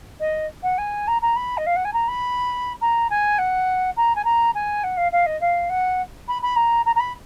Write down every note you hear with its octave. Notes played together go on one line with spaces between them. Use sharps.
D#5
F#5
G#5
A#5
A#5
B5
D#5
F5
F#5
G#5
A#5
B5
A#5
G#5
F#5
A#5
G#5
A#5
G#5
F#5
F5
F5
D#5
F5
F#5
B5
B5
A#5
A#5
A#5
B5